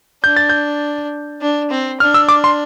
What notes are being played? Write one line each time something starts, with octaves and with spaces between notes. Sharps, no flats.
D4 G6
A6
G6
D4
C4
D4 F6
E6
D6
C6